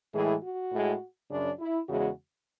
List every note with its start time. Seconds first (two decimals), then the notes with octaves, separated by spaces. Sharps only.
0.14 A2 E3 G#3 G#4
0.43 F#4
0.72 A2 G#3
1.30 F#2 C#3 F#3 D4
1.59 E4
1.88 E2 C#3 G#3 F#4